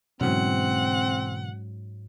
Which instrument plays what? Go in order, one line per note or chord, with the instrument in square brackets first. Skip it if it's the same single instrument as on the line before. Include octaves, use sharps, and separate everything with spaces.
[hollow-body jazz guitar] G#2 F#3 C#4 [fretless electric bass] B2 D3 E3 [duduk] C4 [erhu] F#5